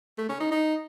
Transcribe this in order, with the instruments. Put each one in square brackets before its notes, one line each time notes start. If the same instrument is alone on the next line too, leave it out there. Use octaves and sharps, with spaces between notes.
[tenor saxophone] A3
C#4
D#4
D#4